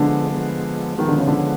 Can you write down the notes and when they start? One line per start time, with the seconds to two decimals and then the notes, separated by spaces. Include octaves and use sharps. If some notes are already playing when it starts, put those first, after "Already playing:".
Already playing: D3 F3 G#3 B3
0.31 F3 G#3 B3
0.97 D#3 F3 G#3 B3
1.08 D3
1.18 C#3
1.27 D3